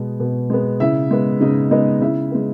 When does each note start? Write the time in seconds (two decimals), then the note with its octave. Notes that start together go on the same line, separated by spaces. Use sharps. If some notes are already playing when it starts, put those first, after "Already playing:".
Already playing: B2 G#3 B3
0.20 B2
0.50 G#3 B3
0.80 C#3 E4 E5
1.11 G#3 B3
1.41 C#3 D#4 D#5
1.71 G#3 B3 D#4 D#5
2.01 C#3 E4 E5
2.31 G#3 B3